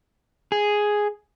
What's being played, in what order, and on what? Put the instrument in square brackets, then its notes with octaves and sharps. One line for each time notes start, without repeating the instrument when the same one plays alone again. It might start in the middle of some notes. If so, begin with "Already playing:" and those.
[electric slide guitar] G#4